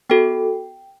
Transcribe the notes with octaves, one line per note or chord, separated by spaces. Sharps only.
B3 F#4 A4 G5